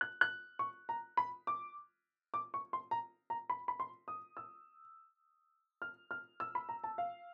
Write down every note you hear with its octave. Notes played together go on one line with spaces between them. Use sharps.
F#6
F#6
C#6
A#5
B5
D6
D6
C#6
C6
A#5
A#5
B5
B5
C6
D#6
E6
F6
F6
E6
B5
A#5
A5
F5